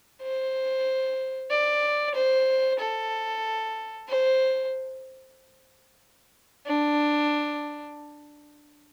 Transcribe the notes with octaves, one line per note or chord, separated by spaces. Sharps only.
C5
D5
C5
A4
C5
D4